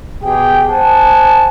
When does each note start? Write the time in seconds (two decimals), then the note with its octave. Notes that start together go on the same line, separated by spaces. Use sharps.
0.24 B2 G4 G#4 G5
0.68 C5 F#5 G#5 A5